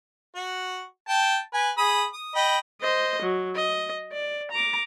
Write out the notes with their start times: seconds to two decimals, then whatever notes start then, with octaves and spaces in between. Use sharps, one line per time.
0.35 F#4
1.08 G5 A5
1.54 B4 G#5
1.78 G#4 B5 D#6
2.13 D#6
2.35 D#5 G5 B5
2.81 C5 D#5
3.22 F#3
3.55 D#5
4.12 D5
4.51 A#5 D6